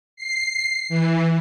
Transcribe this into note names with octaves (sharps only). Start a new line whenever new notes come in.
C7
E3